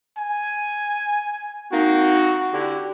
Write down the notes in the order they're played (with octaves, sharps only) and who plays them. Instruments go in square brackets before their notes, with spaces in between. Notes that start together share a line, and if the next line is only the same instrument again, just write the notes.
[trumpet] G#5
[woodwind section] A#3 C4 D#4 [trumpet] F#4
[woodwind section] D3 E4 [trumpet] G4